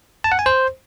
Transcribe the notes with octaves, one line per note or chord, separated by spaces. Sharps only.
A5
F#5
G#5
C5